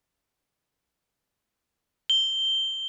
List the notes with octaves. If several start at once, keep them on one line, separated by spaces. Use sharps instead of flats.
G7